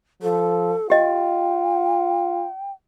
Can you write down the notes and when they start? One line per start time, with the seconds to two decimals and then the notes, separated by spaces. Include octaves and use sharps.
0.23 F3 A4
0.90 F4 G4 D#5 G5